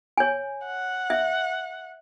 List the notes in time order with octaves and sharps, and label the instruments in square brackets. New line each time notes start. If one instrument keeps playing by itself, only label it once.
[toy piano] C#5 G#5
[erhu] F#5
[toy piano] E5